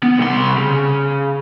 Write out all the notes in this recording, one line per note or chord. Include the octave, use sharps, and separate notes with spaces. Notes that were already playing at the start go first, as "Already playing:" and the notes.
B3
C2 C6
C#3